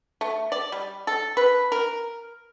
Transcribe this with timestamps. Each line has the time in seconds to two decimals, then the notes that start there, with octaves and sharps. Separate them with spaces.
0.21 A3
0.52 D5
0.72 G3
1.07 A4
1.37 B4
1.72 A#4